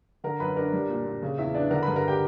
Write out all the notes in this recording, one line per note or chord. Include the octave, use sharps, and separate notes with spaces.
D3 A#4 A#5
F#2 B4 B5
D4 A#4 A#5
G3
A#2
A#2
C#3
E2 E4 E5
B3 D4 D5
D3 A#4 A#5
G2 B4 B5
A#4 A#5
G4 G5